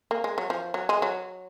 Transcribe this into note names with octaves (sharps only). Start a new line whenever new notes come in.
A#3
G#3
F#3
F3
F#3
G#3
F#3